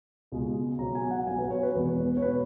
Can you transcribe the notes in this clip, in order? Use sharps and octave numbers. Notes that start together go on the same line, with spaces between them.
C#2 B2 G#3
B1 B2 F#3 A#5
G#5
F#5
B1 B2 F#3 G#5
B4
C#5
B4
E1 E2 B2
C#5
B2 B4